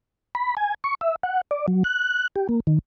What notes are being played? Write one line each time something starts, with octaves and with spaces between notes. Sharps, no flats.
B5
G#5
C#6
E5
F#5
D5
F#3
F#6
G4
A#3
D#3